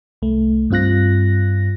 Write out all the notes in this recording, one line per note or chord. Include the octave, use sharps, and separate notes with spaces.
C2 A3
G2 C4 F4 F#6 A#6